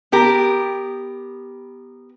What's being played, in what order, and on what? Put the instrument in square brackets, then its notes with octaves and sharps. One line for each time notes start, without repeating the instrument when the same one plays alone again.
[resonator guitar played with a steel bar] B3 G4 A#4